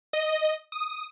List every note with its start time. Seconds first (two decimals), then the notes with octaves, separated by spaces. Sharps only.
0.13 D#5
0.72 D#6